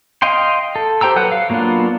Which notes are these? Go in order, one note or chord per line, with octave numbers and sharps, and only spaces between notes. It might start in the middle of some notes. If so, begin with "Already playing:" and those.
D#5 F5 G5 C6
A4
G4 C5 G5 A#5 E6
F#3 A4 B4 F#5
F5
F#3 A#3 B3 D4 F4